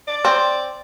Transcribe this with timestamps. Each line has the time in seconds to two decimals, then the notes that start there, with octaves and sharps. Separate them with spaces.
0.08 D5
0.25 C4